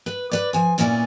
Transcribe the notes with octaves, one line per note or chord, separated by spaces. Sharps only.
B4
B4 D5
F3 G#5
A#2 A#3 B3 C#4 E4 D5